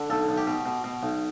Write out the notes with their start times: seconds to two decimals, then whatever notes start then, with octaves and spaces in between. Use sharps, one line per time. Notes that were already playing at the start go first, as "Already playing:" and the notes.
Already playing: D3
0.10 B1 A4
0.29 B1
0.38 G4
0.47 B2
0.66 B2
0.84 B2
1.03 B1